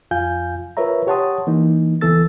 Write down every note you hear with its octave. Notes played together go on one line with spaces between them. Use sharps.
F2 F4 F5 G#5 G6
F4 A#4 B4 C#5 E5 A#5
G4 C#5 F#5 A5 C6 D#6
E3 A#3 D#4
C#2 E3 B3 A4 E6 A6